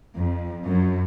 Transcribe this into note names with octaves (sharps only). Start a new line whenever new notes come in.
F2
F#2